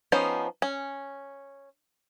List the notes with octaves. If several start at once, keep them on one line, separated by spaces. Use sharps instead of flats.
F3 B3 C#4 D#4 C5
C#4